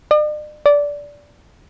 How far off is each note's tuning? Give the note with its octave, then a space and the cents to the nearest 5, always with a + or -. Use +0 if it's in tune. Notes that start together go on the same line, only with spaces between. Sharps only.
D5 +45
D5 -15